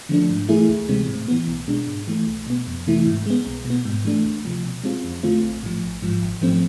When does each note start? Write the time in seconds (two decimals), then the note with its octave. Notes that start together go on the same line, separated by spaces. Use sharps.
0.09 D3 F3 A3 D4
0.30 G#2
0.49 E3 A3 E4 G#4
0.69 D2
0.89 C3 E3 G#3 C4
1.09 A2
1.28 E3 B3
1.47 B1
1.68 B2 G#3 D4
1.87 G#2
2.07 E3 A3
2.27 B1
2.47 B2 B3
2.67 F2
2.87 C3 E3 A3 E4
3.06 G#2
3.26 G#3 B3
3.46 B1
3.65 B2
3.70 B3
3.85 G#2
4.05 E3 A3 D4
4.25 D2
4.45 C3 F3
4.64 B2
4.84 G#3 C4 F4
5.04 F2
5.23 D3 A3 C4 F4
5.43 A1
5.63 A2 F3
5.82 A1
6.02 G#2 F3
6.21 G#1
6.41 G#2 F3 A3 C4